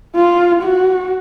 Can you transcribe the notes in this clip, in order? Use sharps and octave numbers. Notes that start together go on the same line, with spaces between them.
F4
F#4